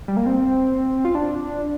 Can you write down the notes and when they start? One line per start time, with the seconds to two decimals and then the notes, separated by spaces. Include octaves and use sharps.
0.08 G3
0.17 A#3
0.26 C4
1.05 F4
1.15 D4